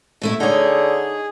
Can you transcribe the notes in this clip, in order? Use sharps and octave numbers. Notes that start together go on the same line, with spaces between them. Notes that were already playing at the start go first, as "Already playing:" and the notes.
B2 A3 E4
D3 D#4 G#4 C#5